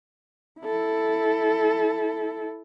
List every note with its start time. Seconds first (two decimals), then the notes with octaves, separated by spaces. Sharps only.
0.61 E4 A4